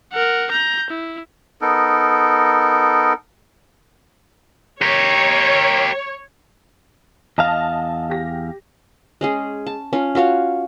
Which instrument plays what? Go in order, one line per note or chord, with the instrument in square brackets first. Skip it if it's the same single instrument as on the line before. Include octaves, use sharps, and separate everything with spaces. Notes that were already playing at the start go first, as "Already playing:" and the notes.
[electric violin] A#4 F#5
A#5 G6
E4
[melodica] B3 D#4 A4 A#4
[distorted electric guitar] G4 A#4 [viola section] C#5
[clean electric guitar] E2 F5 [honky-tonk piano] D#5 A5 A#6
[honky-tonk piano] G4 A#6
[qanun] G#3 C#4 G#4
A5
C#4 F4
F4 F#4 C#5 F5